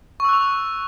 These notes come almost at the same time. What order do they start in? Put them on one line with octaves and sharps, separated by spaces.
C#6 E6 F#6 F7